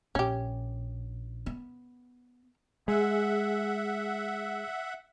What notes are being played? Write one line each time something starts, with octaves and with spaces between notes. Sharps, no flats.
A#1 C#4 G4
B3
G#3 G#4 E5 F#5